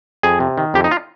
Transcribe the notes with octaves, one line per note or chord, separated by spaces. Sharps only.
F2 G#4
C3
D#3
F2 G4
D#4
F4